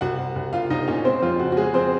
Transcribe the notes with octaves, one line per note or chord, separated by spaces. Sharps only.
C2 F#4 F#5
C2
C2
C2 F4 F5
C2 D#4 D#5
A#2 C#4 C#5
G#3 C4 C5
F2 F4
C#3 F#4
F#4
G#3 G#4
F2 C4 C5